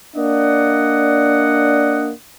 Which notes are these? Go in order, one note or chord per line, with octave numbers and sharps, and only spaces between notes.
A#3 D4 D5 D#5 F#5